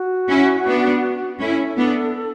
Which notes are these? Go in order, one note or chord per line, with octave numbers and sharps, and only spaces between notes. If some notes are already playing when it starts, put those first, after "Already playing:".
Already playing: F#4
C#4 E4
B3 D4
C#4 E4 A4
B3 D4